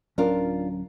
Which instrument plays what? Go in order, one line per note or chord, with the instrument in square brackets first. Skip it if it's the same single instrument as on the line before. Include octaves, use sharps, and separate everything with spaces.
[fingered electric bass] D1 F#3 C#4 [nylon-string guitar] D4 F4 A#4